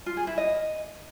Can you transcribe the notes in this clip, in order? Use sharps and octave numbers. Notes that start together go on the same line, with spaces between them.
F4
G#4
E4
D#5